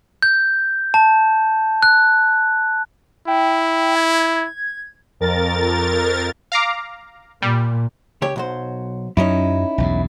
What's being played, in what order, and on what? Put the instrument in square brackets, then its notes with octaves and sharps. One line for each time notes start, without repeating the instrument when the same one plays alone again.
[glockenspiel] G6
A5
F#6
[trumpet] E4 [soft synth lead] G5
[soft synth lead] G#6
[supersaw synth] F2 A#4 A6
[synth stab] F5 A#5 D6
[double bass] A#2 [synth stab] G3
[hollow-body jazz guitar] C#2 G4 C#5
B1 F#3 C5
[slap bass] F#2 F#3 [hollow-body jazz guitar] C#4 D#4 E4
[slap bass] B1 E2 G2